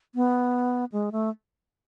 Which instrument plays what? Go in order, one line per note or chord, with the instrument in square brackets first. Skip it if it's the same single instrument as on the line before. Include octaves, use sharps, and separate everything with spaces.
[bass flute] B3
G#3
A3